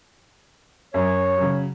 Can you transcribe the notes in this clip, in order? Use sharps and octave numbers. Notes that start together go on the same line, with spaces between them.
F#2 C#5
C#3 F#3